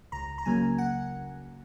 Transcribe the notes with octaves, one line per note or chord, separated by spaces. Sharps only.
C#2 A#5
A#5
C#3 F#3 A#3 G#5
F#5